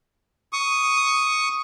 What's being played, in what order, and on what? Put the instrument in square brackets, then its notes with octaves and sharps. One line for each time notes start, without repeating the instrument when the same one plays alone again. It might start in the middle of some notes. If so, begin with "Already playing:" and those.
[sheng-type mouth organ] C#6 D#6